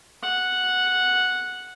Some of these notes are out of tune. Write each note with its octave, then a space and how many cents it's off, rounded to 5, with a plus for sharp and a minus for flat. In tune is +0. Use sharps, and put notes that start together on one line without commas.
F#5 -5